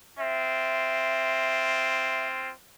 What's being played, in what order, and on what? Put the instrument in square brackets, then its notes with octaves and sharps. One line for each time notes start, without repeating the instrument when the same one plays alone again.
[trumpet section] C4 F4 [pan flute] E5